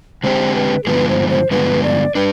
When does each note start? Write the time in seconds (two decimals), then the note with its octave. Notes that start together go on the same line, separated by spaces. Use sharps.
0.23 D3 G#3 C4 G4 C5
0.55 B4
0.83 G#4
0.87 G2 D3 F3 G#3 B3 B4
1.09 C5
1.30 C5
1.51 G2 D3 F3 G#3 B3 B4
1.83 D5
2.15 G3 D4 B4